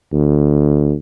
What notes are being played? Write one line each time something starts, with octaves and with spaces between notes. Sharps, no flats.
D2